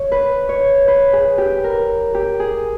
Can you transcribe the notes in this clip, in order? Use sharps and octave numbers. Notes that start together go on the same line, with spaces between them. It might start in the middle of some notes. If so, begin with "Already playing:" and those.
Already playing: C#5
B4
C#5
B4
G#4
G4
A#4
G4
G#4